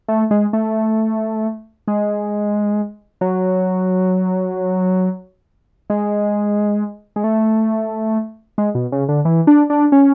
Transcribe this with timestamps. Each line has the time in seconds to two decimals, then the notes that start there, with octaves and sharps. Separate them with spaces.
0.08 A3
0.31 G#3
0.53 A3
1.88 G#3
3.21 F#3
5.90 G#3
7.16 G#3
7.24 A3
8.58 G#3
8.75 B2
8.92 C#3
9.09 D3
9.25 E3
9.47 D4
9.70 D4
9.92 C#4